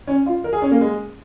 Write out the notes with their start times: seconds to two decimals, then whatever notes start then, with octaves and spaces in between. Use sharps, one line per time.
0.07 C#4
0.26 F4
0.44 A#4
0.53 G#4
0.62 C#4
0.71 A#3
0.81 G#3